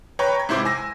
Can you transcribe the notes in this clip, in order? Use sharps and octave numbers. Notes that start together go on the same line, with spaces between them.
B4 C#5 G5 A#5 B5 C#6
A#5 G#6
G#2 C3 E4 C5 C6 D6
G#5 E6 A#6